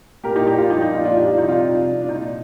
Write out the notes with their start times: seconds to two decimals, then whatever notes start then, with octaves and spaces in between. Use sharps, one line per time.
0.24 A#2 G4 A#4
0.36 D#4 G4
0.47 G3 D#4 G4
0.58 D4 F4
0.70 F3 D#4
0.81 D#4
0.93 A#2 D4 F4
1.05 D4 F4
1.16 G3 G4
1.27 F4
1.38 C3 D#4
1.48 D4 F4
1.63 C3
1.86 C3
2.02 D4
2.09 A#2 D#4